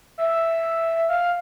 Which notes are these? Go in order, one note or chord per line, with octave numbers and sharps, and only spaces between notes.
E5
F5